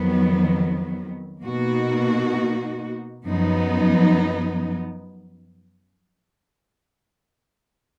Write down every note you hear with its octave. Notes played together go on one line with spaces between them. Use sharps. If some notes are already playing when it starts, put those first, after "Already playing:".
Already playing: F2 D#3 F#3 B3
B2 A#3 D#4 F#4
F#2 F3 B3 D#4